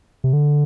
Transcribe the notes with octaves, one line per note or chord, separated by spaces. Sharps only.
C3
D3